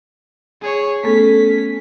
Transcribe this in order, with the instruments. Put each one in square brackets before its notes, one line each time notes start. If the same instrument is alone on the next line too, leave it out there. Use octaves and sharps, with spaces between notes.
[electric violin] G#4 C#5
[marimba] A3 B3 A4 [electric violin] C#4 B6